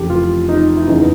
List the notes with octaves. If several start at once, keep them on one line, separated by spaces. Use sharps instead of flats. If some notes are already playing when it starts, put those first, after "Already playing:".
Already playing: F1 F2 C#3 E3 G4 A4
F4
D#4
E4
F#1 E2 C#3 E3 D#4